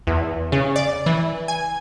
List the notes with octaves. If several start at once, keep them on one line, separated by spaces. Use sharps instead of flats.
E2
C#3
D5
E3
G#5